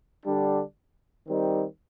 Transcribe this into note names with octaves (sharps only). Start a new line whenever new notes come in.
D3 G3 D4
D#3 G3 C4 D#4